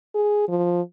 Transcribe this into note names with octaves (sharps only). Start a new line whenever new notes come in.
G#4
F3